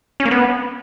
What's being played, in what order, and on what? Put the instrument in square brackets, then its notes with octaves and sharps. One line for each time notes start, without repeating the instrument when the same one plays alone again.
[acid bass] C#4
A#3
B3